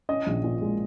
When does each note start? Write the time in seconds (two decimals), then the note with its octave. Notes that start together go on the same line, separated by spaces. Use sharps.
0.09 C#4 D#5
0.27 A#1
0.44 A#2
0.62 G#3